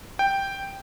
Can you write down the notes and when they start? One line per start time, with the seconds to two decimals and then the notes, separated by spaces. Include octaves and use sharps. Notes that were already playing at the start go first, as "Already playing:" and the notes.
0.19 G5